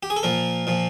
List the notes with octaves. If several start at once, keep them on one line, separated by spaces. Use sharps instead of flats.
G4
G#4
A4
A#2 F3 A#4
A#2 F3